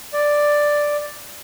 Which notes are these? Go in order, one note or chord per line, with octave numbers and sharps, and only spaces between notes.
D5